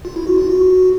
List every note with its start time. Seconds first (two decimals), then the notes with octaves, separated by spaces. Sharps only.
0.05 F4
0.16 E4
0.27 F#4
0.38 F4
0.50 F#4